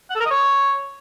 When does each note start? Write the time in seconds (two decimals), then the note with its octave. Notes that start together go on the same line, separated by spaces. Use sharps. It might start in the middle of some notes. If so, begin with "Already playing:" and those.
0.10 F#5
0.15 A4
0.20 A#4
0.25 D#5
0.31 C#5